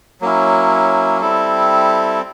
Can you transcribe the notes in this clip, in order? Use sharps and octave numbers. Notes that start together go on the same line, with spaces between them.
F#3 A#3 C#4 E4
G3 C4 E4 A4